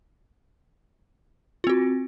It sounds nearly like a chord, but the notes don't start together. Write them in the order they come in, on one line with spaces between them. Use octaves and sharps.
F4 C4 F#4